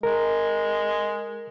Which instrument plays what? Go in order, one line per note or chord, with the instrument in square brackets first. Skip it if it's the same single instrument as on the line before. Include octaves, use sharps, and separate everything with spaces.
[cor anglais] G#3 [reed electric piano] A#4